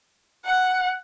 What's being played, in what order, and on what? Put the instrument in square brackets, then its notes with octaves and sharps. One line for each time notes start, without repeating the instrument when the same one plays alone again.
[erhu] F#5